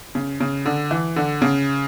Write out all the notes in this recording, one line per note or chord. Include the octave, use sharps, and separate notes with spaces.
C#3
C#3
D3
E3
D3
C#3